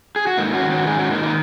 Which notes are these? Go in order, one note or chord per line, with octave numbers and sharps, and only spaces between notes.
G#4
F#4
G#2 A#3 D#4
C#4 F#4
D#3
C#4 F#4
G#2 D#4 G#4
C#4 F#4
D#3 A#3 D#4
A#3 D#4